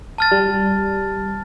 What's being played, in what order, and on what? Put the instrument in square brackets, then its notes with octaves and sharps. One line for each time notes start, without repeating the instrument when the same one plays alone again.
[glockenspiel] A5 F6 A6
[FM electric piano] G3